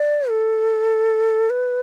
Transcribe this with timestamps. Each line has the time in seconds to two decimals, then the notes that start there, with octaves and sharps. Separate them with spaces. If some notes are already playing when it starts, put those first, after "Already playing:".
Already playing: D5
0.29 A4
1.50 B4